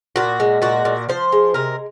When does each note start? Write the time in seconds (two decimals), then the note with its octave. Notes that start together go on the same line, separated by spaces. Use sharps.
0.16 A#2 F#4
0.40 G#3
0.62 A#2 F#4
0.85 A#2
1.09 F3 C5
1.32 G#3
1.54 C3 A#4